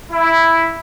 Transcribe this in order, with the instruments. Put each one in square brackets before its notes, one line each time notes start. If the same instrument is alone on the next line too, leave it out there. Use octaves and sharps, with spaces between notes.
[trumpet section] E4